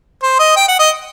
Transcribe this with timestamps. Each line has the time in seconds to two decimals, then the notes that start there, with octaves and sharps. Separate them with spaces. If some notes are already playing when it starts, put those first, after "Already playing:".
0.23 C5
0.39 D#5
0.57 G5
0.68 F#5
0.79 D#5